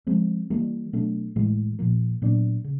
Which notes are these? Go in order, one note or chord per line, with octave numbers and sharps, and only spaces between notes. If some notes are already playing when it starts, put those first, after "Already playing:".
F3 G#3 C4
E3 G3 A#3
B2 F#3 A3 D4
A2 E3 G#3
A#2 F3 A#3
A#2 F#3 B3 D4
C#3